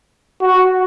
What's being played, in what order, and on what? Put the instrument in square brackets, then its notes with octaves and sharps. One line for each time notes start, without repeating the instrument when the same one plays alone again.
[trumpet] F#4